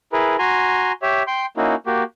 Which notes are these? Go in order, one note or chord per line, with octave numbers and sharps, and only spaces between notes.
E4 G#4 A#4 B4
F#4 G#5 A#5 C6
G4 C#5 E5
G5 C6 G6
A#3 C#4 D#4 E4 F#4
A#3 F#4 G4